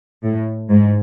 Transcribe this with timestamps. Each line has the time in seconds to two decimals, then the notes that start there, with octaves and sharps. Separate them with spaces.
0.23 A2
0.70 G#2